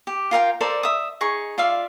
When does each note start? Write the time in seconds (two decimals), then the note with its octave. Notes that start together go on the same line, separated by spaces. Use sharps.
0.07 G4
0.31 F4 A#4 F5 G5
0.61 A4 A#4 C5 D5
0.83 E5 D#6
1.21 D#4 G#4 C#6
1.58 F4 D5 E5 F5